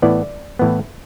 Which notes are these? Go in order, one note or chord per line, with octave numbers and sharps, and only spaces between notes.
A2 E3 B3 D5
A2 E3 B3